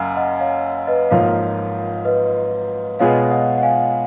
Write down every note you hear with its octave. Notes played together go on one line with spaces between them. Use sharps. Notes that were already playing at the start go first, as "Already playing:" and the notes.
Already playing: F#1 F#2 D#5 F5 F#5 G#5 A#5
D#5 F#5
C#5 F5
B4 D#5
G#1 G#2 F3 A#3 F4 C#5 F5
B4 D#5
B2 G#3 B3 F4 G#4 C#5 F5
D#5 F#5
F#5
F5 G#5